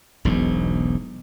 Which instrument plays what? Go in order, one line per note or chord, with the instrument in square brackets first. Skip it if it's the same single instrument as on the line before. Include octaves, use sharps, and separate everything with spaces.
[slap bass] E1 B1 G#2